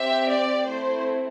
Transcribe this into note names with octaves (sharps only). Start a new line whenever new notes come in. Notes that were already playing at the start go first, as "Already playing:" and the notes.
Already playing: C4 G4 E5
D5
A3 C4 E4 C5